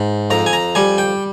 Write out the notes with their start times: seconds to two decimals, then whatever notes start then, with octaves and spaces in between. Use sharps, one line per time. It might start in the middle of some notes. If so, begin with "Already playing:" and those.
Already playing: G#2
0.30 F2 A#5
0.46 G#5
0.53 A#5
0.75 G3 G#5
0.98 G5